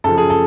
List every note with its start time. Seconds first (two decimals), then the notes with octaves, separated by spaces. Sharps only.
0.04 F#2 C#3 F3 A4
0.18 G#4
0.30 A4